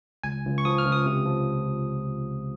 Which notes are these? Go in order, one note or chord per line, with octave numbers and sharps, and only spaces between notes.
C#2 G#5
C#2
C#6
F3 D#6
F6
C#2
D#6
C3
F3